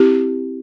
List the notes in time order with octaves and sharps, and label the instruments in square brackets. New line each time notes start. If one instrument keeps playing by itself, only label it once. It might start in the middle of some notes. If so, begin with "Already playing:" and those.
Already playing: [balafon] C4 E4 G4